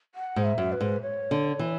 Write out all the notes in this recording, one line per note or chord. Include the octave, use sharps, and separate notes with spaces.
F#5
G#2
E5
F#2
B4
G#2
C#5
D3
E3